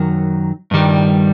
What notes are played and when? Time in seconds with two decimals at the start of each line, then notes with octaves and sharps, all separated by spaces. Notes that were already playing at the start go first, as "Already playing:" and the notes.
Already playing: F#2 D#3 F#3
0.71 G2 D#3 G3